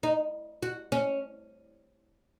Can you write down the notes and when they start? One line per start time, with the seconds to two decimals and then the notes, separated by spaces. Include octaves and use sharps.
0.03 D#4
0.63 F#4
0.92 C#4